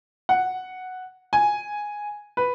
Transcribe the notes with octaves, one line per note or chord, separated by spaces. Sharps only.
F#5
G#5
B4